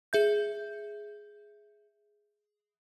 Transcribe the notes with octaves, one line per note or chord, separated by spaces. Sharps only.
G#4 E5 G6